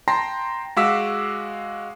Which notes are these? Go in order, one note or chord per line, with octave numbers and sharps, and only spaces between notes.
G5 A5 A#5 C6 A#6 C7
G#3 F#4 F5 D6 E6 B6